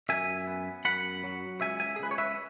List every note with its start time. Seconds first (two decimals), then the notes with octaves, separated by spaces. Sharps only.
0.09 F#2 E5 G#5
0.47 B3
0.85 F#2 F#5 B5
1.24 F#3
1.61 C#2 E5 G#5
1.80 E5 G#5
1.96 G#4
1.99 C#2 B4
2.11 C#5
2.18 B4 E5